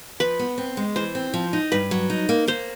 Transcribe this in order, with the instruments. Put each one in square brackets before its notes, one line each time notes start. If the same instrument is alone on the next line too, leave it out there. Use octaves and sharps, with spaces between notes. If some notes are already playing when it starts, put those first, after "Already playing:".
[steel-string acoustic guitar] F3 [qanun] B4
[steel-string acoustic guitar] B3
C4
G#3
[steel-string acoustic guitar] E3 [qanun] C5
[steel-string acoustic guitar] C4
F3
D#4
[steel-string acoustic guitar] G2 [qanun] B4
[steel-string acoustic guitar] F#3
D#4
A#3
[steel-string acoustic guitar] A#3 [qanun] C5